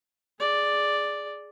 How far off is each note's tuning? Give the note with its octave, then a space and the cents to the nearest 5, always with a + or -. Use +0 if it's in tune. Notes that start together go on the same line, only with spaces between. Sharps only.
G#4 +0 D5 +0